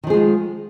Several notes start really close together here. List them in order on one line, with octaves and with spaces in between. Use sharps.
D#3 F3 G#4 G#3 F4